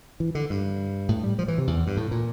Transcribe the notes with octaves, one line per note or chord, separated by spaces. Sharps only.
E3
D3
G2
A2
G3
F3
E3
C3
E2
G2
A2
A#2